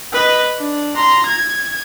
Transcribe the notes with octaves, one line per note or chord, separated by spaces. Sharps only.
B4 D#5
D4
A#5 C6
G#6